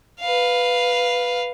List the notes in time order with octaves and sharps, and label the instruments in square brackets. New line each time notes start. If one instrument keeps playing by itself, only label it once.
[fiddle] B4 F5